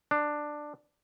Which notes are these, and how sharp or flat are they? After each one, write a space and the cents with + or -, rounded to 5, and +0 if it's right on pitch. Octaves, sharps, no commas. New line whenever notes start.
D4 +10